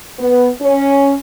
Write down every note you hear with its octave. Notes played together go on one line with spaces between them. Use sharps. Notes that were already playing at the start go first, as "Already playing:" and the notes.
B3
C#4